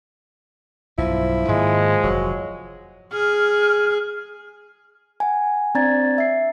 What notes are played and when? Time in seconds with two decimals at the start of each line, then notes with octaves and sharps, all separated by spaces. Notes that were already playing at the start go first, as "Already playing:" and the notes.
0.98 B1 G2 F3 E4
1.49 G#2 D#3 G#3 A#3
2.03 F1 F#3
3.13 G#4 F6
5.20 F#5 G#5
5.75 C4 D4 D5 A#5 G#6 A6
6.18 E5 C7